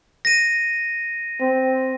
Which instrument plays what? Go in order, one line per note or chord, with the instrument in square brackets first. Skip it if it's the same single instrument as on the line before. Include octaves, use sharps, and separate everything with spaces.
[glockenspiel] A#6 D#7
[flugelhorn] C4